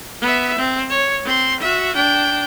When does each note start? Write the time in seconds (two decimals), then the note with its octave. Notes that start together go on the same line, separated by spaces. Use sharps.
0.22 B3 E5
0.58 C4
0.90 C#5
1.25 C4 C6
1.60 F#4 E5
1.95 D4 G5